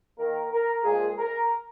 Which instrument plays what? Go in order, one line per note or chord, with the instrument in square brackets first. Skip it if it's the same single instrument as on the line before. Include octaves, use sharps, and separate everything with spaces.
[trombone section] D#3 A#3 A#4
A#4
A#2 F3 G#3 G#4
A#4